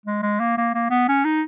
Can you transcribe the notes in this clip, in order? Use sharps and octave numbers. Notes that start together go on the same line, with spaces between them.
G#3
G#3
A#3
A#3
A#3
B3
C#4
D#4